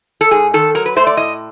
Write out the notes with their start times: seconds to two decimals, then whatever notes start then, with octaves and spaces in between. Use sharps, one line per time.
0.21 A4
0.31 G#2 G#4
0.54 D#3 A4
0.75 F#3 A#4
0.86 B4
0.96 A3 C5
1.07 D5
1.17 A2 D#5